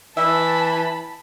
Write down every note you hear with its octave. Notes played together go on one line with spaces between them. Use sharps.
E3 E5 A5 B5